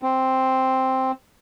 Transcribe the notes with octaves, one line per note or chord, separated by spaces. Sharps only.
C4